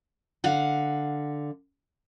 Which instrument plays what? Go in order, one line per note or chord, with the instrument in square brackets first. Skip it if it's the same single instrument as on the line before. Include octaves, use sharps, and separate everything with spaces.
[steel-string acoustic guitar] D3 F5 F#5